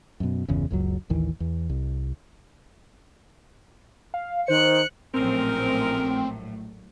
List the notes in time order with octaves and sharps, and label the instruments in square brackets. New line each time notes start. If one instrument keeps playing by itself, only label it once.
[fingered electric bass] F#2 B2
G1 E2 C#3
F#1 C#2 F#2 F#3
A1 D#2 E3
E2
C2
[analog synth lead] F5
[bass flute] D#3 [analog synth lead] C5 [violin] F#6 C#7
[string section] A#1 A2 F#3 [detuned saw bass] C4 [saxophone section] C#4 D#4 A#4